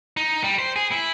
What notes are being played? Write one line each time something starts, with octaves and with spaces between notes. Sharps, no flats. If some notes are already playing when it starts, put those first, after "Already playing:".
D#4
G3
C5
G#4
E4